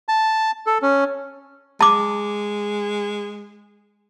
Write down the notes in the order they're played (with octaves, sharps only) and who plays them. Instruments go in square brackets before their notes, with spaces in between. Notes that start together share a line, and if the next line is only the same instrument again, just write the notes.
[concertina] A5
A4
C#4
[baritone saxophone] G#3 [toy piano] A5 D6